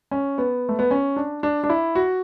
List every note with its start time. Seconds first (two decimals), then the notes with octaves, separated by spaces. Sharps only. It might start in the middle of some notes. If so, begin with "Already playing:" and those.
0.11 C#4
0.38 B3
0.69 A3
0.79 B3
0.91 C#4
1.16 D4
1.43 D4
1.64 D4
1.70 E4
1.95 F#4